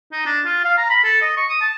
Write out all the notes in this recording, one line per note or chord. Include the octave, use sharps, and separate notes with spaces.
D#4
D4
F4
F5
A#5
B5
A4
D#5
C#6
D#6
A5